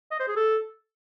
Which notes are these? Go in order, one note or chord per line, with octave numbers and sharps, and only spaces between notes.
D#5
C5
G#4
A4